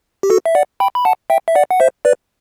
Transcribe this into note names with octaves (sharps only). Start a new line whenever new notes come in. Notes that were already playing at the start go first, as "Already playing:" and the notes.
G4
F#4 A4
E5
D5 F#5
G5 B5
B5
F#5 A5
E5 G5
E5
D5 F#5
F#5
C5 E5
B4 D5